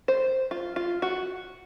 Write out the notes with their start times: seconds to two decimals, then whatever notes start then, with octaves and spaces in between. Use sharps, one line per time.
0.08 C5
0.51 F4
0.76 F4
1.02 F#4